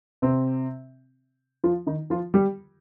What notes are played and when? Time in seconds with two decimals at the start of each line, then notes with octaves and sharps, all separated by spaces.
0.22 C3 C4
1.64 F3 F4
1.87 D#3 D#4
2.10 F3 F4
2.34 G3 G4